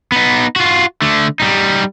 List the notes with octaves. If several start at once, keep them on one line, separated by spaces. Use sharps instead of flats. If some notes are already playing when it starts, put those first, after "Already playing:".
B3 D#4
F4 F#4
D3 A3
G3 D#4